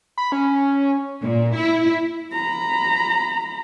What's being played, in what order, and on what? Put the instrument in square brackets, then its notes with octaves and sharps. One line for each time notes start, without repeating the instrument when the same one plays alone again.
[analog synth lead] B5
C#4
[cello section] A#2
E4
[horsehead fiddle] A#5 B5